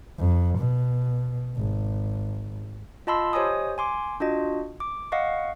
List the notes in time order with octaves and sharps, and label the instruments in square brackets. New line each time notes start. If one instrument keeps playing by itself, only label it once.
[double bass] F2
B2
G#1
[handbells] F4 D#5 A5 B5 C6 E6
G4 C5 C#5 D#5 G#5 D#6
G#5 C6 D6
D4 F4 F#4 D#5
D6
D#5 F5 F#5 C#6